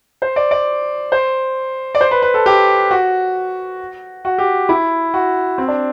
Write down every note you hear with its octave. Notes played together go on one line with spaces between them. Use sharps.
C5
D5
D5
C5
D5
C5
B4
B4
A4
G4
F#4
F#4
G4
E4
F#4
C4
D4